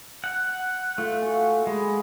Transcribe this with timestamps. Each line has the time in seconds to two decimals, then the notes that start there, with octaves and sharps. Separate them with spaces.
0.24 F#5
0.98 A3 F4 E5
1.22 F#4 G#5
1.67 G#3 B5